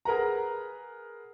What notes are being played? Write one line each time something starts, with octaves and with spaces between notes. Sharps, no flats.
G#4 A#4 B4 F#5 A#5